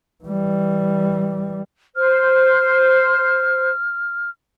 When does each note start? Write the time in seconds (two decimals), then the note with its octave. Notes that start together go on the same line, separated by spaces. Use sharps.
0.24 E3 G3
1.95 C5 F6